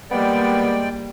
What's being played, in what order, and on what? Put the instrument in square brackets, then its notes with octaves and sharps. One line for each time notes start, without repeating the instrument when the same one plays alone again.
[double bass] G3 A#3 [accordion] G#3 D5 G5 [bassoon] B3